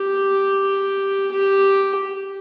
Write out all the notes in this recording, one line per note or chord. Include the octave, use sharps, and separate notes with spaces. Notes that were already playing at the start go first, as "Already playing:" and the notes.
Already playing: G4
G4